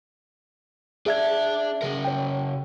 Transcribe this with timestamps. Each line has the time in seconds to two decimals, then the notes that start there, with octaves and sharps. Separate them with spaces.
1.06 D4 G#4 D5 E5 G#6
1.82 C#3 A#4
2.05 C#5 G5